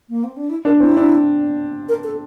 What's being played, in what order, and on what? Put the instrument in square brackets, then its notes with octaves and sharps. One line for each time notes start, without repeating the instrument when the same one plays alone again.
[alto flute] A#3
C4
D4
E4
[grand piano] D4 [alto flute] A#4
[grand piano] C4 [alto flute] E4
[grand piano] D4
[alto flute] A#4
A4